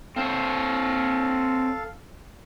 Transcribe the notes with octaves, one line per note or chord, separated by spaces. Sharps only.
C4 A4 C5 C#5 F5